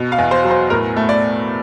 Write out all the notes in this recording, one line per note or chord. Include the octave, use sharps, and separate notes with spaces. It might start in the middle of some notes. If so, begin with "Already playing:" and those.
Already playing: B2
F5
E2
C5
F#3
C5
A2 A#4
A3
D5